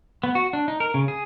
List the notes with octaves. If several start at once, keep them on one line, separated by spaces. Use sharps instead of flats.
B3
F#4
D4
D#4
A#4
C#3
G#4